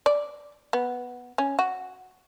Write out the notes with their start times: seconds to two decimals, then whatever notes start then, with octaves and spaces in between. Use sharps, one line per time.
0.06 D5
0.73 B3
1.38 C#4
1.59 F#4